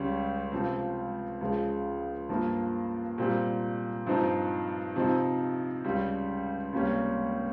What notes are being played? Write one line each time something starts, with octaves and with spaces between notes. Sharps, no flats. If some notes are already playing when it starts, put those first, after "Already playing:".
Already playing: C#2 C#3 G3 C#4
C#2 C3 F3 C4
C#2 C#3 F3 G#3
G2 F3 A#3
A#2 G3 C4
G2 F3 C4 D#4
C3 F3 C4 D#4
C#2 C#3 G3
C#2 C3 G3 A#3 C#4